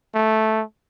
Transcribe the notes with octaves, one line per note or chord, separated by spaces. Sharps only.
A3